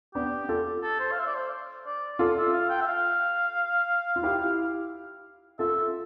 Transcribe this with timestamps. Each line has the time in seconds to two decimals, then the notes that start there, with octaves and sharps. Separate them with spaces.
0.15 B3 D4 G4
0.49 F4 A4
0.83 A4
1.00 C5
1.12 F5
1.19 E5
1.27 D5
1.35 C5
1.86 D5
2.19 F4 A4 D5
2.37 E5
2.53 F5
2.70 G5
2.81 E5
2.87 F5
4.16 F4
4.23 E4 G4
5.59 F4 A4 E5